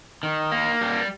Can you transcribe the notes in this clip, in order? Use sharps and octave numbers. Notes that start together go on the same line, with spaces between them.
D#3
A#3
G3